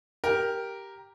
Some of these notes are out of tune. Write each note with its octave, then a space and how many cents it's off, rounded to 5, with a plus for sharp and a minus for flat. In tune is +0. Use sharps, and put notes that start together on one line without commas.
G4 +0 A#4 +0